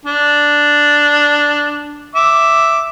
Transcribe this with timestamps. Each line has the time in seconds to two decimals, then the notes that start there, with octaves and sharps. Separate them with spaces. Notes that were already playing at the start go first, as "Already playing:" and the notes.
0.05 D4
2.15 E5 D6